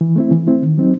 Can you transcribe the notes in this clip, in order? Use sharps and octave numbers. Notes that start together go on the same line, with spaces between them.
E3
A3 C4 E4
E3
A3 C4 E4
D#3
F#3 C4 D#4